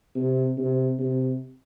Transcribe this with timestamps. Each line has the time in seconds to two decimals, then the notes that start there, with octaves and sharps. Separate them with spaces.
0.15 C3
0.57 C3
0.99 C3